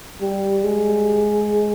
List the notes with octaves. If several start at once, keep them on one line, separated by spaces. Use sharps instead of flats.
G3
G#3